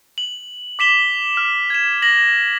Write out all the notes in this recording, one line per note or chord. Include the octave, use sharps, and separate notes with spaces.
F#7
D6 B6 E7 G7
F6
G#6 E7
A#6 F#7